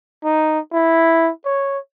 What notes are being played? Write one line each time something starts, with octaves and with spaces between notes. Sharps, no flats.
D#4
E4
C#5